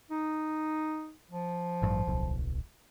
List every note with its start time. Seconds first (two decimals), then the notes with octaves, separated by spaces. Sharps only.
0.11 D#4
1.31 F3
1.82 A1 G2
2.07 D1 B1